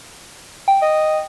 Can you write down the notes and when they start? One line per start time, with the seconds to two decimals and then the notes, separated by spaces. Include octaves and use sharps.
0.68 G5
0.82 D#5